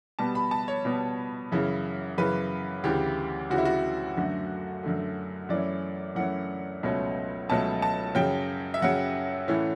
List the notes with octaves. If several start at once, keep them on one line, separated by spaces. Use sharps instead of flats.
B2 G3 B3 A5
B5
A5
C#5
B2 G3 B3
F#2 C#3 E3
F#2 C#3 E3 B4
D2 C#3 E3 G4
D2 C#3 E3 F#4
E4
F#4
F#2 D3 A3
F#2 D3 A3
F#2 E3 A3 C#4 D5
F#2 E3 A3 C#4 F#5
C#2 B2 F#3 A3 C#4
C#2 B2 F#3 A3 C#4 A5
A5
F#2 C#3 F#3 G5
E5
F#2 C#3 F#3 F#5
A2 E3 A3 C#4